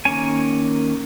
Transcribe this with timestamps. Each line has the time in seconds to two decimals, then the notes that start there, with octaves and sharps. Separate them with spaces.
0.05 D#3 A#3 C#4 G#5